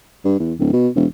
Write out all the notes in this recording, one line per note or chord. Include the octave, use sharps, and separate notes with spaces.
G2
E2
D1
B2
E1